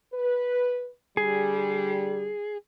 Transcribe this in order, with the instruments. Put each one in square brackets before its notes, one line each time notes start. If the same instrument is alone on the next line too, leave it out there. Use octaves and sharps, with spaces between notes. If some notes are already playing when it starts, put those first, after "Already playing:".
[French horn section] B4
[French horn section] D3 G3 [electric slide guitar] G#4